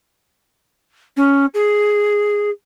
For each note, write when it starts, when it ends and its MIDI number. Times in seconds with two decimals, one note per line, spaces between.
1.17 1.46 61
1.54 2.50 68